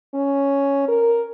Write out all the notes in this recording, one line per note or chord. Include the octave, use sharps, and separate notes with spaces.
C#4
A#4